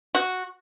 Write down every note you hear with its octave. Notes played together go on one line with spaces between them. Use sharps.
F#4